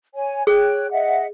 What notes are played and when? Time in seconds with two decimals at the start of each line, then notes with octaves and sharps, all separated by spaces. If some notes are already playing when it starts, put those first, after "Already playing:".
0.15 C#5 G#5
0.47 G#4 C#5 G5 F#6
0.91 D#5 E5 F#5